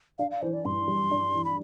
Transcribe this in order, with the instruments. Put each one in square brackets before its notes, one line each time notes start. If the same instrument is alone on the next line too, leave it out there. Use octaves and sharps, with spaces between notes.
[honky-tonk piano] D4 [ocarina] F5
[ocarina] F5
[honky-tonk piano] E3 [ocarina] C5
[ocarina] D5
[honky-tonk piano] G2 [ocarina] C6
[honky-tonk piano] G3
D4
E3
[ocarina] B5